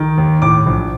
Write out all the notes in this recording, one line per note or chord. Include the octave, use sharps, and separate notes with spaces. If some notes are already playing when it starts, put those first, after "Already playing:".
Already playing: D#3
D#2
A2 D6
A#1